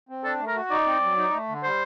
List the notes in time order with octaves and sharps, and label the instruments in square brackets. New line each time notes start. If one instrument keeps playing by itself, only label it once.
[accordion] C4
[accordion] D4 [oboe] A4
[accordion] A3
[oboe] A#4
[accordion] F#4
[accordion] D#4 [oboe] D5
[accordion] C4
F#3
D#4
A3
D3
[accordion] G3 [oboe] C5